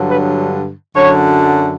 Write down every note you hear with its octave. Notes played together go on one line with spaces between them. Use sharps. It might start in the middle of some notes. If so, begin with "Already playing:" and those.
Already playing: G2 D3 F#3
B4
F#2 D3 F#3 C#5